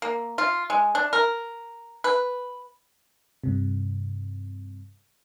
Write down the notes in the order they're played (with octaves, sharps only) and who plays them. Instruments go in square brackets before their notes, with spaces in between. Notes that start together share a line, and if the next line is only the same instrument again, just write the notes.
[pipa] A#3
F4
G#3
D4
A#4
B4
[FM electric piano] G2 C3